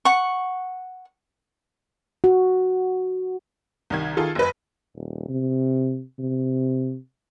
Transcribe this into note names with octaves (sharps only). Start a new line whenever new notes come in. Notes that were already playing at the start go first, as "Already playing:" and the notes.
F#5 C#6
F#4
C2 D#3 G#6
D#3 F4 G#4 A4
F#1 B4
D#1
C3
C3